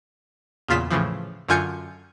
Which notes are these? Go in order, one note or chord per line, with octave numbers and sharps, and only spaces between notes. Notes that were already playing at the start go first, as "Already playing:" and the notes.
E2 A#2 C#3 F4 B6 E7
A2 C#3 E3 F3
F#2 D3 F4 G#5 G6 C#7